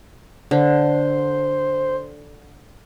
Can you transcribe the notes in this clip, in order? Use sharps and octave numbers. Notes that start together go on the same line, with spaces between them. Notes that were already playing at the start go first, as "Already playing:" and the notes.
D3 C5